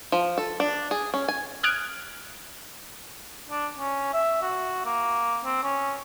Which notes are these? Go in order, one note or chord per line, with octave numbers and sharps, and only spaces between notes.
F3
A4
D4
G#4
C#4
G#5
D#6 F6 F#6 G#6 D7
D4
C#4
E5
F#4
A#3
C4
C#4